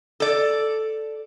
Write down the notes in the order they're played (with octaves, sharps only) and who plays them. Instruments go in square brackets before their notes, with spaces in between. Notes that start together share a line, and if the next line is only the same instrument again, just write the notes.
[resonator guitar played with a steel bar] A4 D5